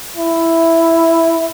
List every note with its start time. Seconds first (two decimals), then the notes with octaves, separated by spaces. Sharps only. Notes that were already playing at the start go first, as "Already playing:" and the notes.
0.16 E4